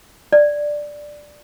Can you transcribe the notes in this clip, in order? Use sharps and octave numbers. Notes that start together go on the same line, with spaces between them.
D5